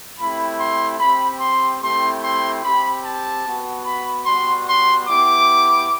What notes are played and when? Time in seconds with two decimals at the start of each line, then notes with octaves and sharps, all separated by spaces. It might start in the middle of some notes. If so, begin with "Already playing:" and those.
0.19 A3 C4 E4 G4 B5
0.59 C6
1.00 C4 G4 B5
1.40 C6
1.81 A3 C4 E4 G4 C6
2.23 C6
2.63 C4 G4 B5
3.03 A5
3.45 B3 F#4
3.85 B5
4.26 G3 B3 F#4 C6
4.67 C6
5.07 B3 E4 G4 D6